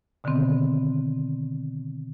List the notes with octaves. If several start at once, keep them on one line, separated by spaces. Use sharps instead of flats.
B2 D3 D#3 B3 C4